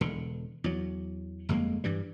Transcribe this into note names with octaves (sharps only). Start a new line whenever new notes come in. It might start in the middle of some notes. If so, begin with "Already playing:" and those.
E1 D3
E2 F#3
G1 F2 G#3 A#3
G2 E3 G3